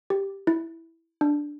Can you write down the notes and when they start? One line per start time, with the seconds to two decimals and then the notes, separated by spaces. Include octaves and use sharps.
0.10 G4
0.47 E4
1.21 D4